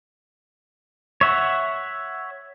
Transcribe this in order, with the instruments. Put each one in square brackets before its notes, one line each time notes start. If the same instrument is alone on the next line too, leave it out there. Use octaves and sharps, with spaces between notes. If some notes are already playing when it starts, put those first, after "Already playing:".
[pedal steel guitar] C#5 E5 F#5